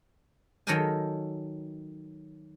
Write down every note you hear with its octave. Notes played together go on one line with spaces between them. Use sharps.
D#3 F#3 A4 A#4 G5 G#5